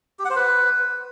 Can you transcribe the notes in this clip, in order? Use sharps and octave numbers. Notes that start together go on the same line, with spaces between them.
G4
F#5
C5
B4